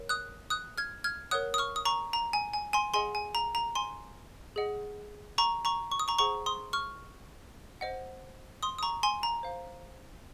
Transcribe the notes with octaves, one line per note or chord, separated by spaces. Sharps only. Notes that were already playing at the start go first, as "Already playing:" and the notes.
Already playing: A#4 C#5
D#6 F#6
D#6 F#6
F6 G#6
F6 G#6
A#4 C#5 F#5 D#6 F#6
D#6
C#6 F6
D#6
A#5 C#6
A#5
G#5
G#5
G#5 C6
G#4 D#5 F#5 G#5 C6
G#5
A#5
A#5
G#5 C6
G#4 D#5 F#5
A#5 C#6
A#5 C#6
C#6
D#6
A#5 C#6
G#4 C5 D#5 F#5 A#5 C#6
C6 D#6
C#6 F6
C5 D#5 F#5
C6 D#6
D#6
A#5 C#6
G#5 C6
A#5
C5 F5